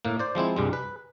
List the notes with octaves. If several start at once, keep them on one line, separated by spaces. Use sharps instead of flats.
A2 A#3
C5 D5
F3 G#3 C4 E4
C2 G2 G3 G#3
B4